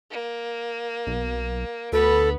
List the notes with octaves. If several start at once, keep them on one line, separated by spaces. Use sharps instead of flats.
A#3
B1
D2 B3 A4 B4